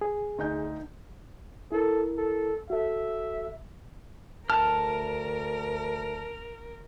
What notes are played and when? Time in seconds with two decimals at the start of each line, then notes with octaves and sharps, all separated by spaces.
0.01 G#4
0.38 D2 D#4 G6
1.72 E4 A4 A#4
2.17 A4
2.70 F#4 A4 E5
4.50 D2 A#4 A5 F6